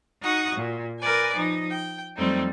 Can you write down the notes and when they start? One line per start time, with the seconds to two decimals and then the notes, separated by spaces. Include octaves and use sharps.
0.21 D#4 F#4 F#5 C#6 D#6
0.55 A#2
1.00 A#4 B4 D5 G#5
1.34 F3 D#4
1.71 G5
2.17 F2 F#3 G3 A3 C4 D#4